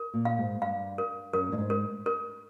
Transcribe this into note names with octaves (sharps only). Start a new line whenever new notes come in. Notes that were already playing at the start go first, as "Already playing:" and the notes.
Already playing: A#4
A#2
F5
G#2
G2 F5
A#4
F#2 A#4
G2
G#2
A#4
A#4